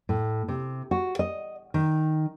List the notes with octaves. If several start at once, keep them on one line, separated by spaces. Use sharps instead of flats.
A2
C3
F#4
D#5
D#3